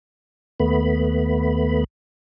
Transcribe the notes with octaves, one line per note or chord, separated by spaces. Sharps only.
D#2 A3 B3 B5